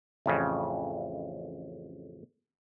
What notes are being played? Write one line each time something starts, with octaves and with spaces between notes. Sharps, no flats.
A1 F2 C#3